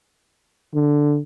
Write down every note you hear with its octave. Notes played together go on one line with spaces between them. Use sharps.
D3